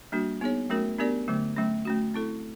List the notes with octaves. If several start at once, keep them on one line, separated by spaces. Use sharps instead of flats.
G3 A#3 D4 F#4
B3 D#4 G#4 C#5
F#3 A3 C#4 F#4 A#4
B3 D4 G4 A#4 D5
D3 F#3 A3
F#3 A3 C#4
A3 C#4 F#4
C4 E4 A4